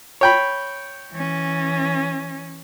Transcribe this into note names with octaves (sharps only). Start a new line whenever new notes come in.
C#5 G5 B5
E3 C#4